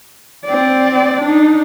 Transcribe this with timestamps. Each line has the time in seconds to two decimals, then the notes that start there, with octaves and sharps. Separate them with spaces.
0.45 C4 D5
1.21 D4 D#4